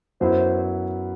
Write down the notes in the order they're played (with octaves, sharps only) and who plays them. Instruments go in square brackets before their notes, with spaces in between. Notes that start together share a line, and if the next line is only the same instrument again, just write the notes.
[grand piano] F#2 F#3 B3 E4 [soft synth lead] C5